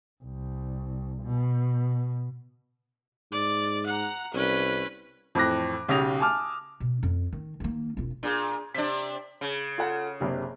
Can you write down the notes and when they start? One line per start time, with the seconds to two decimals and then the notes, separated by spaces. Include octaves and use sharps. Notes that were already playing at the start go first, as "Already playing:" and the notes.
0.23 C2
1.23 B2
3.32 G#2 D5
3.86 F#5 A#5
4.34 C2 C#4 B4
5.35 F2 A2 E3 D6 F#6 A#6
5.88 B1 C#3 G4 D#6 A#6 F7
6.20 G#5 A5 D6 F6
6.80 B2
7.03 F2
7.33 D#3
7.60 D#3 A#3
7.97 E1 F4
8.23 A#2 D4 G#4
8.74 C3 D4 B6
9.41 C#3
9.78 F4 A4 F#5
10.20 F#1 C3 D4